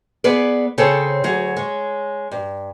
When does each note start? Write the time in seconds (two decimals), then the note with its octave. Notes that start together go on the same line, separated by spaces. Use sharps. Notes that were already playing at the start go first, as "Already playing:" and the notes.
0.24 B3 G#4 B4 D5
0.78 C#3 C4 G#4 A4 C5 C#5
1.24 D2 F#3 G#4
1.56 G#3 C#5
2.31 G2